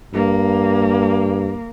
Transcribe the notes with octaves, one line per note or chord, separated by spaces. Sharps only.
G2 A#3